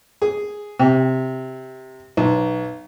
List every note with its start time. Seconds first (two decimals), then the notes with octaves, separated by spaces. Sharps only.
0.22 G#4
0.79 C3
2.17 B1